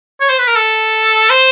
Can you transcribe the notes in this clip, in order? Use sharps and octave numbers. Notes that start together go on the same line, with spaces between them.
C#5
C5
B4
A#4
A4
C5